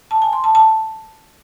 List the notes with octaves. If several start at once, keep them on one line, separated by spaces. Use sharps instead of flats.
A5
G#5
C6
A5
A5